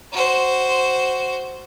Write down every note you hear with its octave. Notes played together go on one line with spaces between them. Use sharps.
F#4 C5